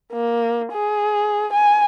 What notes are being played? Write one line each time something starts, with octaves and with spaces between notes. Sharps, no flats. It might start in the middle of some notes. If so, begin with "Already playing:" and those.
A#3
G#4
G#5